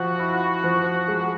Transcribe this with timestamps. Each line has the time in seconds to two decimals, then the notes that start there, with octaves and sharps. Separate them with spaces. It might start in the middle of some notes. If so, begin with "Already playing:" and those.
Already playing: F3 F#4
0.19 E4
0.64 F3
1.08 G#3